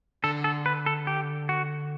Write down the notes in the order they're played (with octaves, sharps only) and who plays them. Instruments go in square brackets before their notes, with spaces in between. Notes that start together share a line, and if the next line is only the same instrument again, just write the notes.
[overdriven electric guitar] D3 [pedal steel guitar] A4
[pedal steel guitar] A4
B4
A4
G4
F#4